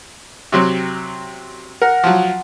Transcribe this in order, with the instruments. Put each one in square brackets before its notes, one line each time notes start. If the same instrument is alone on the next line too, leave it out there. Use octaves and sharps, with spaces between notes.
[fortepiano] C3 F#3 C4
[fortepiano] A#4 [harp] F#5
[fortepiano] F3 F#3